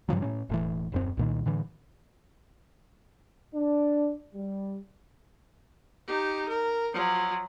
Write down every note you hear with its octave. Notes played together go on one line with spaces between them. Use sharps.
G2 C#3 F3 F#3
A2 C#4
E1 A2 E3
D#1 F#2 C4
C2 A#2 D#3
A2 D3 E3
D4
G3
D#4 G4
A#4
F3 F#3